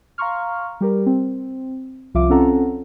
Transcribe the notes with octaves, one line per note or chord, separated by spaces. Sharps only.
F5 A#5 C6 C#6 F6
G3 G4 A#4
C4
C2 F3 F4 E5 D6
C4 C#4 F4 A4 F#5 A#5